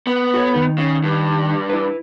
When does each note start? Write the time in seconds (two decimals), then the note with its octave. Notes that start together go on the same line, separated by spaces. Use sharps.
0.07 B3
0.34 F#4 A4 C#5
0.54 D#3 D#4
0.78 C#3
1.04 G2
1.70 E4 B4